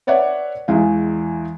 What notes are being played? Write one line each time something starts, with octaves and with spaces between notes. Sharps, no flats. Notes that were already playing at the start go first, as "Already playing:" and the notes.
B4 C#5 D5 E5 F#5
E2 E3 G#3 F5